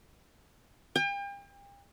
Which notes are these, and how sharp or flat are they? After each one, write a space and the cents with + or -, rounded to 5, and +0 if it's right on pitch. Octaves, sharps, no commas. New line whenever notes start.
G5 +40